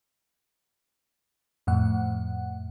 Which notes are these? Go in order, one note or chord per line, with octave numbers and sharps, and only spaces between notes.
F2 A2 F#5